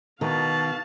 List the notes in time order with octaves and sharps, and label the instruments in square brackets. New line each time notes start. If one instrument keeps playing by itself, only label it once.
[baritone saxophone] B2 [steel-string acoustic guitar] D#3 [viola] F5 A5